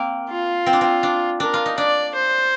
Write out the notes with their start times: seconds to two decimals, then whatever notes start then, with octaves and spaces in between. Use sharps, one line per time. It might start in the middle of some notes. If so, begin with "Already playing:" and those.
Already playing: A#3 C4
0.29 F4
0.66 C4
0.73 D4
0.81 C4
1.03 D4
1.40 D4 A#4
1.54 F4
1.66 D#4
1.78 D4 D5
2.15 C5